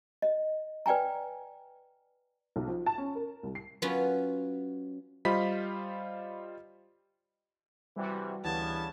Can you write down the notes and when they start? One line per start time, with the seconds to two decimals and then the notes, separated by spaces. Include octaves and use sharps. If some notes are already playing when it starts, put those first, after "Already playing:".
0.22 D#5
0.86 B4 D5 G5 G#5 A#5
2.56 B1
2.68 F3
2.86 A5
2.98 C#4
3.15 A#4
3.43 C2
3.55 C7
3.82 F#3 B3 C#4 F4
5.25 G3 F4 C5 D#5 B5 B6
7.96 C3 E3 G3 F#4
8.44 D2 C#3 E3 G3 B3 A5 G#6